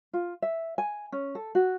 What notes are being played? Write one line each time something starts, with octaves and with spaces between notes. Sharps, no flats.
F4
E5
G#5
C#4
A4
F#4